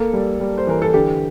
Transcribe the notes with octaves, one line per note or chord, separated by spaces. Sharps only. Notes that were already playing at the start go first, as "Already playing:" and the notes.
Already playing: A#3 A4
G3
G3
C5
E3 A#4
A4
D3 G4